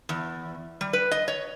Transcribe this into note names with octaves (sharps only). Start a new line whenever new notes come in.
E2
G3
B4
D#5
C#5